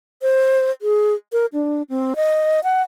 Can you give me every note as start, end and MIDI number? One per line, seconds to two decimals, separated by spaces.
0.22 0.71 72
0.82 1.14 68
1.33 1.46 70
1.53 1.82 62
1.90 2.14 60
2.16 2.60 75
2.64 2.82 78